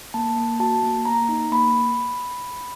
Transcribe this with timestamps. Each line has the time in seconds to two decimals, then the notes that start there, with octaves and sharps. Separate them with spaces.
0.14 A#3 A5
0.37 A#3
0.60 F#4 A5
0.83 A#3
1.05 A#3 A#5
1.29 D#4
1.52 A#3 B5